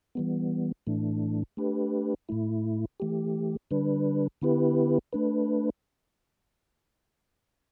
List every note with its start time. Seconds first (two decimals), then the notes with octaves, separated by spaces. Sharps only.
0.15 E3 G3 B3
0.87 A2 E3 A3 D4
1.57 A3 D4 G4 B4
2.29 A2 A3 E4
3.00 E3 A3 G4
3.71 D3 G3 D4 B4
4.42 D3 B3 E4 G4 B4
5.13 A3 D4 B4